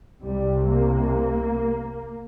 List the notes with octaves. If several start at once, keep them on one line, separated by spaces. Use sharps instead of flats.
C2 C3 G3
A#3